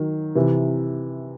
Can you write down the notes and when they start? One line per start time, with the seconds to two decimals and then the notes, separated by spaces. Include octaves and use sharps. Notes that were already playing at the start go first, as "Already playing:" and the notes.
Already playing: D#3 F#3
0.35 C3 E3